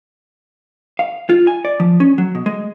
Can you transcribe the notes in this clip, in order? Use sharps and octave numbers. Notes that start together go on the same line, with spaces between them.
F5
F4
G#5
D5
F3
C#4
F#3
B2
G#3